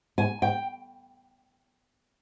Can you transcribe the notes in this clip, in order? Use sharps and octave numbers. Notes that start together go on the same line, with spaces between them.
G#5
G5